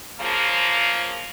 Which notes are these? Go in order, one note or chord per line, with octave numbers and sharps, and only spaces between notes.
C#3 F3 A#3